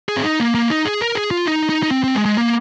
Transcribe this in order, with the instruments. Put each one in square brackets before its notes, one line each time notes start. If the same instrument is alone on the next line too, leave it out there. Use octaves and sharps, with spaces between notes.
[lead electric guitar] G#4
C4
D#4
A#3
A#3
D#4
G#4
A#4
G#4
F4
D#4
D#4
D#4
C4
C4
G#3
G#3
A#3